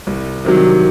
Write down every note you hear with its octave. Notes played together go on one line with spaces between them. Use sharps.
C2
C3 D#3 F#3